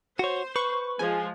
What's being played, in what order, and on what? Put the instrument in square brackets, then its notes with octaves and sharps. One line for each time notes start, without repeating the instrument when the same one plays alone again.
[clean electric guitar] F#4 C#5 [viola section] C5
[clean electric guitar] B4 [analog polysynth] C#6
[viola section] F3 G#3 [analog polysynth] G#5